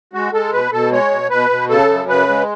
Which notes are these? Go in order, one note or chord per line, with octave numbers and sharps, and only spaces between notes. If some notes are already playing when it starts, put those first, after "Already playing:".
G#3 F#4
G#3 A4
B2 B4
B2 A4
G#3 C#5
B2
B2 B4
B2
C#3 A4
F#2
C#3 B4
G#3